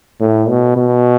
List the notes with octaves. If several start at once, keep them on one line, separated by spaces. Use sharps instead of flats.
A2
B2
B2